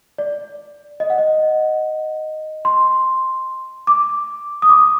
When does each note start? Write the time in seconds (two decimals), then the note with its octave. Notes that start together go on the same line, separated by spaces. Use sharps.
0.18 D5
1.00 D#5
1.10 F#5
1.18 D#5
2.65 C6
3.87 D6
4.62 D#6
4.69 D6